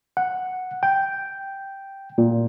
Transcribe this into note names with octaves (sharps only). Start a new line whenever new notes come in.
F#5
G5
A#2